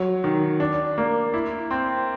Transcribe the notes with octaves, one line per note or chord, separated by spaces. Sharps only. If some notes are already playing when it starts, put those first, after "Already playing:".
Already playing: F#3
D#3
D4
A#3
E4
C4